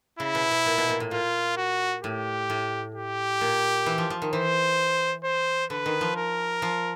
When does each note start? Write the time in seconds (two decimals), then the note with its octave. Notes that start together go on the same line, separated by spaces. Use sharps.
0.20 C#3 E4
0.35 B2
0.51 B2
0.66 A#2
0.78 B2
0.89 A#2
1.00 A2
1.11 A#2 F4
1.57 F#4
2.03 A2 G4
2.50 A2
2.95 G4
3.41 A#2
3.86 E3
3.98 F3
4.10 F3
4.22 D#3
4.33 E3 C5
5.24 C5
5.70 D3 B4
5.86 D#3
6.01 F3
6.17 A#4
6.62 F3